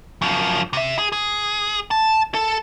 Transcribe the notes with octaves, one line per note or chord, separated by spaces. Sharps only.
F#2 F3
C3 E5
G#4
G#4
A5
A4